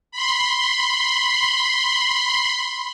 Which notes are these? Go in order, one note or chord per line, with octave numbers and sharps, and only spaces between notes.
B5 C6